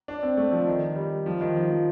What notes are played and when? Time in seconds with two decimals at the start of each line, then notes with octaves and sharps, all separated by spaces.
0.08 D4
0.23 C4
0.37 A3
0.52 F3
0.67 D#3
0.96 G3
1.26 F3
1.41 D#3
1.56 F3
1.70 F3